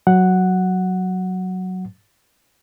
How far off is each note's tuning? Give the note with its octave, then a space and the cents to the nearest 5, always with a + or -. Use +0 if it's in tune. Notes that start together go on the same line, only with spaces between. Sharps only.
F#3 +0 F#5 +0